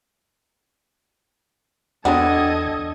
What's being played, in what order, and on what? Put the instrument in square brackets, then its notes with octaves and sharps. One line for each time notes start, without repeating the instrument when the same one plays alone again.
[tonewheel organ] E2 G#6 [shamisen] B3 C4 F#4 [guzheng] D4 [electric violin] A4 D#5